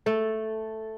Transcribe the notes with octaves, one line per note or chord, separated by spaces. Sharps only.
A3 A4